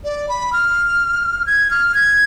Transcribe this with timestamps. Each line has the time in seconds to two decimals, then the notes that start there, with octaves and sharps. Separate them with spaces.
0.04 D5
0.29 B5
0.53 F6
1.46 G#6
1.71 F6
1.94 G#6